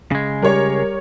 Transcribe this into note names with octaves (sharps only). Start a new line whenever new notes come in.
C#3 G#3
G3 G4 A#4 C#5